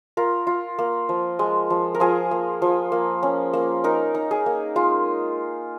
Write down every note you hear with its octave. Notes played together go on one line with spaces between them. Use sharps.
F4 A#4
F4
A#3
F3
G#3
F3
A#4
F3 G#4
A#3
F3
A#3
C#4
A#3
D#4 A#4
D#4
G#4
A#3
G#3 F4